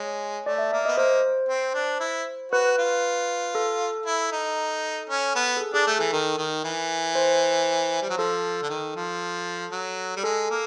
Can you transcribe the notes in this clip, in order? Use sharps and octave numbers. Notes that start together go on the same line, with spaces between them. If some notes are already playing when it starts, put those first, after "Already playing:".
Already playing: G#3 C#5
A3 D5
E5
A#3 E5
B3 D#5
A#3 C5
C4
D4
E4
F#4 B4
F4
A4
E4
D#4
C#4
B3
A4
G#4
D4 G#4
A3
E3 A4
D#3 A#4
D#3
E3
C5
G3
F#3
F3 A4
D3
D#3
F3
F#3
G3
G#3 A4
A#3